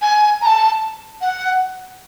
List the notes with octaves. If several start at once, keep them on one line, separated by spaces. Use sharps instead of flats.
G#5
A#5
A5
F#5